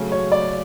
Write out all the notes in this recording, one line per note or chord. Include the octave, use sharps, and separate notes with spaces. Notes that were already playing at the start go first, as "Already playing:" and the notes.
Already playing: C#3 F#3 A3 C#4
C#5
D5